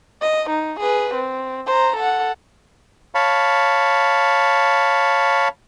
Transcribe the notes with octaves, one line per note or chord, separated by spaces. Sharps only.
D#5
D#4
G#4 B4
C4
C5 A#5
A4 F#5
C#5 F5 A5 B5